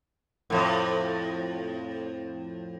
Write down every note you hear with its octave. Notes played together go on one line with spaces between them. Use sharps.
F2 A2